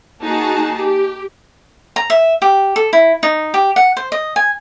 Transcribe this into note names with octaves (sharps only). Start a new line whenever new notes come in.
A#3 D#4 F#4 G#4 A5
G4
A#5
E5
G4
A4
E4
D#4
G4
F#5
C5
D#5
G#5